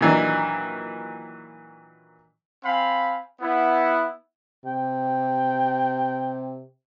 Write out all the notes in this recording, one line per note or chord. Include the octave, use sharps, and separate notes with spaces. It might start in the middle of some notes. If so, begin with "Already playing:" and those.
A#2 D#3 E3 F#3 D4
C4 F5 G#5 B5
B3 E4
C3 G5